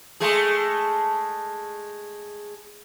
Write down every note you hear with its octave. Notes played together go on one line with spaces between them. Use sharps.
G#3 A3 G#4